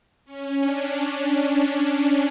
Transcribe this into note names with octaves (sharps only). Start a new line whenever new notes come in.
C#4
D4